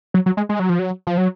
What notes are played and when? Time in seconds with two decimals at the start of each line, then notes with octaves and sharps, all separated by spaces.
0.14 F#3
0.26 F#3
0.37 G#3
0.49 G#3
0.60 F#3
0.69 F3
0.79 F#3
1.07 F3
1.18 F#3